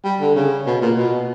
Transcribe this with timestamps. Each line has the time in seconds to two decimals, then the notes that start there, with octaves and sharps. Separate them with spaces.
0.04 G3
0.21 D3
0.35 C#3
0.67 B2
0.81 A#2
0.97 B2